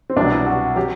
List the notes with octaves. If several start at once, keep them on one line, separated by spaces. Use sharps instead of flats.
C4
C2 B2 F#3 D4
E4
F#4
F#3 G4